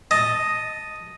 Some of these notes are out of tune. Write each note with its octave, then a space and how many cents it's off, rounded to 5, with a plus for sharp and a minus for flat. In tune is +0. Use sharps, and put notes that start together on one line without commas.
D#5 +0 A5 +0